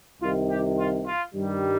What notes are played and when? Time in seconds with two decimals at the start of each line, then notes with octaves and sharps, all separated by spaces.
0.21 C2 C3 D#3 F4
0.49 G4
0.78 F4
1.05 F4
1.34 G2 D#3 G3